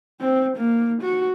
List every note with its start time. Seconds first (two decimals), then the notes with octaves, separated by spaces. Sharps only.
0.21 C4
0.57 A#3
1.02 F#4